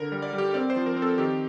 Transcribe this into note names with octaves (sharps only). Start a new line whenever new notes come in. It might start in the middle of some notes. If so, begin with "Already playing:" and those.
Already playing: D3 A#4
G3
D5
G3
G4
C4 D5
C5
F3
A#4
C4
A4
D#3 G4